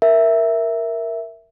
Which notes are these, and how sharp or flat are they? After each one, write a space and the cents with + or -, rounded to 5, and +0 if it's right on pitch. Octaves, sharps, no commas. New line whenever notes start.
A#4 +0 E5 +0